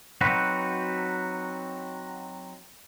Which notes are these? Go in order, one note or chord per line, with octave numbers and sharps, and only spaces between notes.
F#3 C4 D#4 F#4 B4